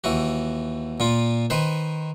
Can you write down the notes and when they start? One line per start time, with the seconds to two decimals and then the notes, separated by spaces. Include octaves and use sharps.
0.04 D#2 E3 F#4
1.00 A#2 F4
1.50 D#3 B4 C5